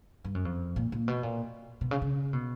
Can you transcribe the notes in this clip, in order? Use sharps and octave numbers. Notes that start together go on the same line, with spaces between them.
G2
F#2
F2
A#2
A#2
B2
A#2
B2
C#3
C#3
B2